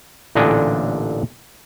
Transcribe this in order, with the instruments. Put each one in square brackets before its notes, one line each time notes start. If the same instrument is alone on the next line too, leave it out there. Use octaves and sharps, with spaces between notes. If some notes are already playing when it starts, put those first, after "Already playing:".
[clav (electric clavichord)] A1 A#2 D3 D4 D#5 G#5